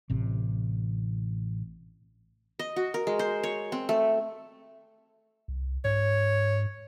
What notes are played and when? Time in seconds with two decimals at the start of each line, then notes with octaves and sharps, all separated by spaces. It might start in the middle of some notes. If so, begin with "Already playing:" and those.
0.10 A1 C3
2.59 D#5
2.76 F#4
2.94 A#4
3.07 G#3
3.19 C5
3.43 C#5
3.72 C4
3.89 A3
5.48 C2
5.84 G#2 C#5